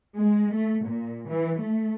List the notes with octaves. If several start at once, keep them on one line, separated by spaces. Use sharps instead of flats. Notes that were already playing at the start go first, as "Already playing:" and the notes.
G#3
A3
A#2
E3
A3